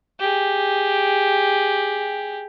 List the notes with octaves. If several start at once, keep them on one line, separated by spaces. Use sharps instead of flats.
G4 G#4